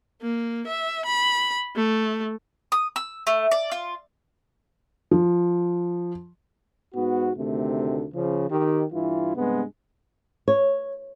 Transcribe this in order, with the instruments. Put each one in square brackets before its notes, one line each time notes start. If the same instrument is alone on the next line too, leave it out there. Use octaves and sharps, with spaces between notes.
[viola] A#3
E5
B5
A3
[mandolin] D#6
E6
A3
D5
F4
[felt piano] F3
[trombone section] G#2 B3 F#4
D2 C3 D#3 A3
C#3 F3
D#3 G4
G2 E3 E4 F4
G2 C3 G#3 B3
[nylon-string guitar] C#5